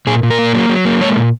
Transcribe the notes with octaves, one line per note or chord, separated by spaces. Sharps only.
A#2 G#4
A#2
A#4
A#3
F#3
F#3
A#3
G#3 C#5
A#2